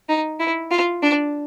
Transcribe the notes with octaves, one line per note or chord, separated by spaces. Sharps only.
D#4
E4
F4
D4